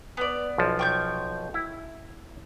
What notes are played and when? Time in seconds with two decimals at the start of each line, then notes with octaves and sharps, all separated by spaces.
0.17 B3 D5
0.58 B1 F3
0.79 G5 C#6 G6
1.54 E4